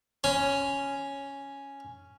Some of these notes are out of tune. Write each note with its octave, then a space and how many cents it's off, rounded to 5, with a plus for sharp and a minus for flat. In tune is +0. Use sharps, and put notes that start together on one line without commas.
C#4 +0 C6 -35